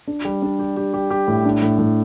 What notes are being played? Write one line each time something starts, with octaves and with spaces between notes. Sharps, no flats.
D4
G3
D4
G4
G4
G4
G4
A2
D4
A2
A2